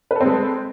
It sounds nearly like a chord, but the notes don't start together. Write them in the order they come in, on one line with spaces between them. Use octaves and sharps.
B4 A4 C4 G#3